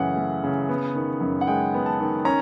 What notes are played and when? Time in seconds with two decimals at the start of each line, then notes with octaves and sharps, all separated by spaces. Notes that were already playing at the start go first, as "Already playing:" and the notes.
Already playing: F#2 C#3 E3 A3 F#5
0.16 A3
0.44 C#3
0.69 B3
0.95 D#3
1.21 F#2
1.41 F#5
1.47 G#3 G5
1.74 B3
1.86 A5
2.00 D#3
2.25 C#4 A#5